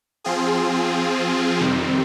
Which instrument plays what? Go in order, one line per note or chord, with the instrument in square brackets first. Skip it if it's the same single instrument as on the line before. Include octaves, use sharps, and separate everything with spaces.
[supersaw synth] F3 C4 F4 G#4
F2 C3 D#3 G3 C4